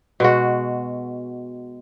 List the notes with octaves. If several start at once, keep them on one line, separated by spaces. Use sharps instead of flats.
B2 G#3 F#4